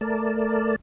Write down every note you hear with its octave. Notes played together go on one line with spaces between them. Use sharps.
A3 A#4 D5 A5